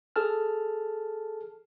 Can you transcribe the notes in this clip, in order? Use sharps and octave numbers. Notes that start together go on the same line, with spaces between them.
G#4 A4 A5 F6